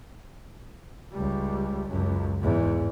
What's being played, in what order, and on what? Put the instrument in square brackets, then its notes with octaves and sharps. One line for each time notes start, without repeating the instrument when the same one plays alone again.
[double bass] C#2 G3
C#2 F#2
E2 G#2